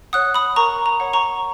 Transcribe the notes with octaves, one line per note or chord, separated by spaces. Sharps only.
C#5 F#5 D#6 F#6
B5 D#6
A#4 A#5 C#6
A#5
C#5 F#5
A#5 C#6